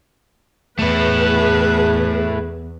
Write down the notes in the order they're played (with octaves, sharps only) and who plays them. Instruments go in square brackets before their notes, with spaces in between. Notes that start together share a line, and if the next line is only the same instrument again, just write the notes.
[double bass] E2 [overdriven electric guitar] A3 E4 [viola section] G#4 B4